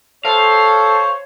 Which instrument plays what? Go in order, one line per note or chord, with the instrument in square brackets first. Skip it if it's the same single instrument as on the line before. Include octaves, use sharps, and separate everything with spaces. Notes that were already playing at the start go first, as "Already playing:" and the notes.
[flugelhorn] A4 [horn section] C5 [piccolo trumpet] C#5 [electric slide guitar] F5